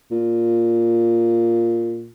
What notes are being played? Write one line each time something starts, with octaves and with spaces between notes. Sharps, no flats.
A#2